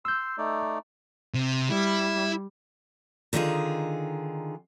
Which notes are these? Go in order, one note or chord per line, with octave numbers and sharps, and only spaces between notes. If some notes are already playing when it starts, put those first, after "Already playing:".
C6 E6 G6
A3 D#4 D5
C3
G3 E4
D3 D#3 D#4 F4 G#4